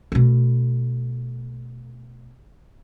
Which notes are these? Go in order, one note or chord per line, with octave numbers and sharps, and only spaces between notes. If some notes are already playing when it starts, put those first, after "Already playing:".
B2 A3